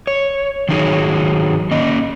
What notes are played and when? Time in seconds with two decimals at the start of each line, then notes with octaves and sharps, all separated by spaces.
0.07 C#5
0.69 D#3 F#3 D4 D#4 G#4 C#5
1.71 A#3 C#4 D#5